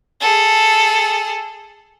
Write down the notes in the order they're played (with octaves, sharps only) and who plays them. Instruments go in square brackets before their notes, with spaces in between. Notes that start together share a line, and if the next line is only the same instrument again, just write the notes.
[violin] G#4 A4